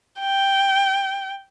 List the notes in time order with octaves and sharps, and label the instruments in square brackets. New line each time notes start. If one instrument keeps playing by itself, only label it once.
[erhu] G5